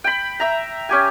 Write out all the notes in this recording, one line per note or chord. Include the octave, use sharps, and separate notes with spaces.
G5 B5
E5 A#5
C#4 G4 G#5